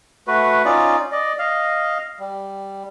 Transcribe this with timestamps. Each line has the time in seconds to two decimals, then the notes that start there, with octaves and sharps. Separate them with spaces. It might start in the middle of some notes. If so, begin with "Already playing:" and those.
0.28 A3 F#4 B4
0.65 C#4 D#4 F4 D5
1.12 D5 D#5
1.39 D#5 F5
2.20 G3